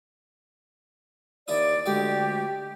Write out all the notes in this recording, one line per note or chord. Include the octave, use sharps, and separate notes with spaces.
D#2 E4 D5 D#6
D2 G#3 G4 D5